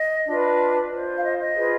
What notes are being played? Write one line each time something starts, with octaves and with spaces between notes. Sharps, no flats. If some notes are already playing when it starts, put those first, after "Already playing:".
Already playing: D#5
D4 F4 B4
F4 C5
F5
D#5
D#5
F4 G#4 B4